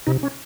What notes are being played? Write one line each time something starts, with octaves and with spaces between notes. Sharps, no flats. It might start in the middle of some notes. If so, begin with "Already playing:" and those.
C3 D#4
C#4